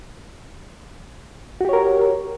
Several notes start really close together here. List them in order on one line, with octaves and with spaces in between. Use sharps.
F#4 G4 C#5 A#4